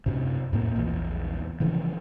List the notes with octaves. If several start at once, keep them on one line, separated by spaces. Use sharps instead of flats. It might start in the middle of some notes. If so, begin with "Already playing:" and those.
F#2 C3
F#2 A2 A#3
A#1 E2
C#3 E3 F3